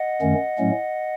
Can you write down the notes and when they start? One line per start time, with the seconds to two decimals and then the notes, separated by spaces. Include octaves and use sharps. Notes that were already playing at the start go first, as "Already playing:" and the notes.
Already playing: D#5 F#5
0.21 F#2 D#3 A3 C#4
0.58 A2 F#3 A3 C#4